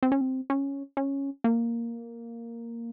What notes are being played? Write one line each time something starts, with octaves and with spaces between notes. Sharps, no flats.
C4
C#4
C4
C#4
C#4
A#3